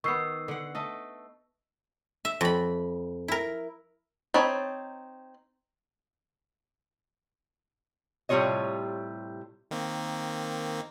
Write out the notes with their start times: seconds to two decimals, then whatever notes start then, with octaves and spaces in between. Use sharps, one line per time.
0.04 D#3 B3 C#6 E6 C7
0.48 D3 F#5
0.75 A3 A4 D#5
2.25 E5
2.41 F2 B5
3.28 E4 A#4
4.34 C4 D#4 C#5 A5 B5
8.29 A2 C3 G3 F4 C#5 D#5
9.71 D#3 A#3 C4